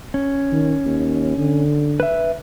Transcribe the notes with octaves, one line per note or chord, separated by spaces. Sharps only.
C#4
D#3
D#2
D3
B4 E5